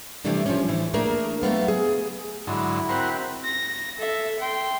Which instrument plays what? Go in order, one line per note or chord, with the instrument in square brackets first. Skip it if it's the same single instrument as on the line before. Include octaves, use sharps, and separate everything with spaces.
[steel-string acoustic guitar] C3 E3 G3 A3 D4
F3 G3 C#4
A2 E3 E4
A3 A#3 D4 G#4 A#4
F#3 A3 B3 F5
G#4
[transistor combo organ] G#2 D3 F#3 [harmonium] E4
[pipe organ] C4 B5 F#6 [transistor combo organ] F#4 A#4 C5
[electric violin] A#6
A4 E5
G5 C6